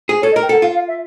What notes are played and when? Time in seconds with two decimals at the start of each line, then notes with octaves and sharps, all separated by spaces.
0.09 G#4
0.22 A4 C#5
0.32 D#5
0.36 A#4
0.42 G5
0.49 A4 F#5
0.62 F4 F5
0.75 F5
0.88 E5